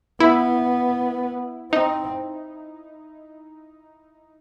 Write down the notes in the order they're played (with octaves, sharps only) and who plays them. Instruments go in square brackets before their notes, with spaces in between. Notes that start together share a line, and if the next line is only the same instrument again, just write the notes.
[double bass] B3 [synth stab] E4
[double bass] C4 [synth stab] D#4